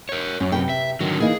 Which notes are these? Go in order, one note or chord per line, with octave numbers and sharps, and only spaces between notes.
A#4 C#5
F#2 C#4
C3 B4 G5
E5
D3 D#3 F#3
E3 A#3 D#4 G#4